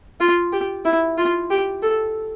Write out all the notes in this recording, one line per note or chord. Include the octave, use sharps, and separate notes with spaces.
F4
G4
E4
F4
G4
A4